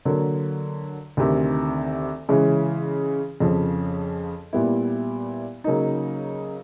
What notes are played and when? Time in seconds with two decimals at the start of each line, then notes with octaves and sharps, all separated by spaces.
0.05 D3 F#3 A#3
1.17 D2 C3 D#3
2.29 C#3 E3 G#3 C#4
3.40 F2 C#3 F3
4.53 A#2 G3 B3 E4
5.64 C#3 F#3 A#3 D#4